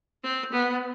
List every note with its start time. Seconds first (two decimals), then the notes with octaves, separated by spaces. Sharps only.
0.24 C4
0.52 B3